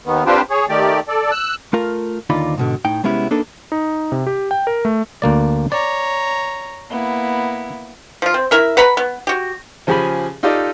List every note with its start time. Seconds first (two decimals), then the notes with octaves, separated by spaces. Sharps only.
0.06 D#2 D#3 B3
0.26 C4 D4 F4 G4 B4 C5
0.50 G#4 C#5
0.69 D#3 A3 G4 D5
1.08 A4 D5
1.31 E6 F#6
1.73 A3 F4 A#4
2.30 D#2 D3 D#4 F4 D5 B5
2.58 G#2 B2 D3
2.85 A2 D#4 G5
3.03 C2 G#3 B3 C#4 E4 G4
3.31 A#3 D4 D#4 A4 B4
3.72 D#4
4.12 C3
4.27 G4
4.51 G5
4.67 A#4
4.85 A3
5.22 D2 A#3 D5
5.72 C#5 D5 A#5
6.91 A#3 B3 E4
8.22 F3 F4
8.34 C4
8.51 E4 A#4 E5
8.77 B4 F#5 A#5 B5
8.97 B3
9.27 F#4 G4
9.87 C#3 F3 G4 G#4 G#5 B5
10.43 D#4 F4 G4 A4 D5 D#5